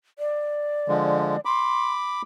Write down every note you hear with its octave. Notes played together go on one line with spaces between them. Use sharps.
D5
D3 F3 G#3
B5 C6 D6